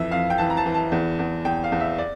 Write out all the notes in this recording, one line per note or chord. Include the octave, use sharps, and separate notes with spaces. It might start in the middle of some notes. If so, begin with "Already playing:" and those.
Already playing: F2 E3 E5
F2 F5
G5
E3 A5
A#5
A5
E3
A5
E2
E2
E2 G5
F5
E2
E5
D5